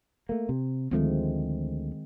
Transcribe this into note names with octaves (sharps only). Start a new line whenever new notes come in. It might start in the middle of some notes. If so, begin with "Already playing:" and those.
A3 A#3
C3
D2 D#3 F3 G#3 A3 C4